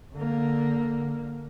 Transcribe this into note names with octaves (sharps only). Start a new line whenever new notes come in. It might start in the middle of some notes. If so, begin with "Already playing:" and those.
D3 A#3